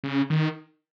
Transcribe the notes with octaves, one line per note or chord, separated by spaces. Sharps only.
C#3
D#3